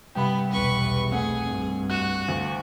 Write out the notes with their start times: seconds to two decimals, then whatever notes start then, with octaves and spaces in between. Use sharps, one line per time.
0.15 G2 C3 G3 B3 G5 B5
0.51 B1 E2 B4 C#6
1.12 C2 F2 A3 C4 G#4 F#5
1.44 G2
1.90 F#4 F#6 E7
2.28 D2 F5